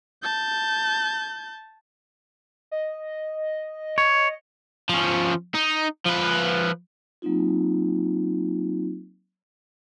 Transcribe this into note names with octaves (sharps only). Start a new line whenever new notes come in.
A5 G6
D#5
C#5
F3 C#4
D#4
F3 B4
F#3 A#3 C4 D#4 F4